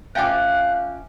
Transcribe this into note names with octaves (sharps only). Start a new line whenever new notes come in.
C#4 F4 E5 F5 G5 G#5 D6 F#6